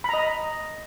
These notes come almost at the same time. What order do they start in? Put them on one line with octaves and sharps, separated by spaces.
B5 A#5 D#5